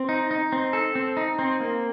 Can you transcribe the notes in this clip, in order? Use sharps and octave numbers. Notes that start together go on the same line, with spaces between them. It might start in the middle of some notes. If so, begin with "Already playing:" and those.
Already playing: C4
D#4
D#4
C4
A4
C4
D#4
C4
A#3